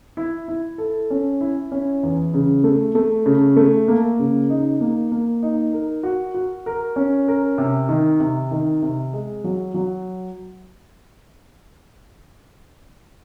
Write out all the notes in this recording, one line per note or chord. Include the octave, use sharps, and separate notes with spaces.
E4
E4
A4
C#4
E4
C#4
E2
C#3
A3
A3
C#3
A3
A#3
C#3
D#4
A#3
A#3
D#4
A#4
F#4
F#4
A#4
C#4
A#4
C3
D#3
C3
D#3
C3
G#3
F#3
F#3